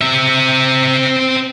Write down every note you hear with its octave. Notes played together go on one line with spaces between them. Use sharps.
C4 E5